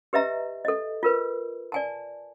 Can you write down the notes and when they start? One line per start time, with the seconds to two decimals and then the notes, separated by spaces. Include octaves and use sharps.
0.13 G4 B4 D#5 E5 A#5
0.65 A4 D#5
1.03 F4 A#4 B4
1.72 D5 G#5 A5